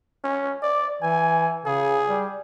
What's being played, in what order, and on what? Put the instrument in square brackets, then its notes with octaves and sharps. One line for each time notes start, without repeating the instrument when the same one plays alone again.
[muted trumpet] C#4
D5
[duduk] E3 [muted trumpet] G#5
[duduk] C#3 [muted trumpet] G#4
[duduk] G3